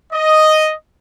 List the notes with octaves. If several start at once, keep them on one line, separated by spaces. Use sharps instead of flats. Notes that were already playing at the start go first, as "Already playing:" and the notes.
D#5